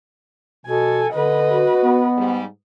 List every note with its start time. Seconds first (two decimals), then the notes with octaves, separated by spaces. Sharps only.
0.66 B2 A4 G#5
1.13 D3 B4 D#5
1.50 F#4
1.82 B3
2.17 G#2 G3